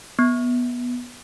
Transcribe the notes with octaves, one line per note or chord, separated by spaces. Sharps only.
B3